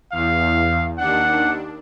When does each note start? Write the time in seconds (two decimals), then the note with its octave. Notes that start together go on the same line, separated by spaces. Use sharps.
0.12 E2 F5
0.98 D#2 D4 F#5